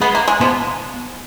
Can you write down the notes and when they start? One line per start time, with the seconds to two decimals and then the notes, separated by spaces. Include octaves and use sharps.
0.01 G#3 B3
0.15 A#3
0.28 G#3
0.41 F3 B3